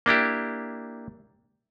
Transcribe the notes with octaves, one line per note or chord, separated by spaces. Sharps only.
A#3 D4 E4 G4